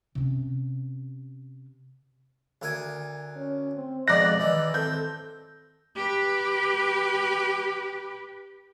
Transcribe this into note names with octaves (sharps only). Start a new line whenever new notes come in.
C3 C#4
D2 A#4 G#5
C#4
C4
F2 G#2 B2 D5 D#5 F#6 A#6
D#3 E3
C4 A4 G6
G4 B4